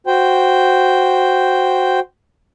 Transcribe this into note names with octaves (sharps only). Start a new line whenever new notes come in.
F#4 C5 G5